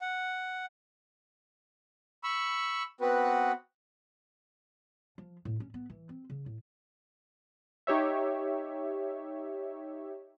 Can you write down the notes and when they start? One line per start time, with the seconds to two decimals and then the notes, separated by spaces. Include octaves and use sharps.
0.01 F#5
2.23 B5 C#6 E6
3.01 B3 C4 F#4 B4
5.18 F3
5.45 A2
5.60 C#4
5.74 B3
5.90 E3
6.09 C4
6.30 C#3
6.46 A2
7.87 D#4 G4 C#5 E5